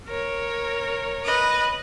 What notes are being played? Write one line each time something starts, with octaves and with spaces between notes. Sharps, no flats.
A#4 C#5
B4 D#5